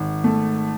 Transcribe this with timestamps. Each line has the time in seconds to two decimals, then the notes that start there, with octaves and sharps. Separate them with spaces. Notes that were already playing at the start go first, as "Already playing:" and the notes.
Already playing: G#1
0.24 A3